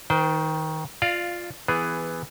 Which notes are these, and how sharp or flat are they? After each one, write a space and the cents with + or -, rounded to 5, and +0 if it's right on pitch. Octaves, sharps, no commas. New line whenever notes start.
D#3 +20 C5 -25 G5 +0
F4 +0 D5 +25 F5 -10
E3 +0 B3 +10 G#4 +0